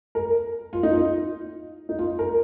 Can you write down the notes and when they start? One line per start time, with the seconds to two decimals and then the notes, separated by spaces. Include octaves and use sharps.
0.15 A#4
0.73 F4
0.83 D#4
0.93 F4
1.89 D#4
1.99 F4
2.19 A#4